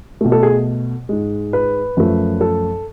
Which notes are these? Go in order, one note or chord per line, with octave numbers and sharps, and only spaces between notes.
B2 A3
A4
G#4
G#2 G#3
B4
F#2 F3 A3
A4